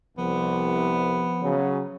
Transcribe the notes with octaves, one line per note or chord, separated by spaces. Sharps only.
C2 F3 B3
C#3 F#3